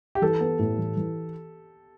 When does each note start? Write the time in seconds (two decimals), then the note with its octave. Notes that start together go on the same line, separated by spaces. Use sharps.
0.15 G4
0.22 E3 A4
0.41 B3
0.59 A2
0.78 E3
0.97 E3